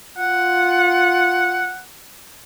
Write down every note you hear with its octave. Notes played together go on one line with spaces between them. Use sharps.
F4 F#5